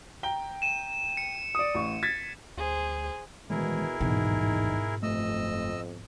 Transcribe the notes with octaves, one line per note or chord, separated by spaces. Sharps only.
G5 A#5 G7
D#7 E7
C#7
D5 D#6
A1 C#6
G#6 A6 B6
D2 G#4 C5
B2 D#3 E3 G#3 E4 G#4 A#4
D#1 A1 G#2 B2 E3 D#4
F#1 F2 A3 D#5 E6